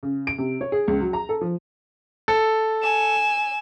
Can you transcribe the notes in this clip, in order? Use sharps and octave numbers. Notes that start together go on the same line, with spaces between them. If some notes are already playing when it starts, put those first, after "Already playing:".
C#3
D7
C3
C#5
G#4
C#2
F#3
A#5
A4
F3
A4
G#5 E7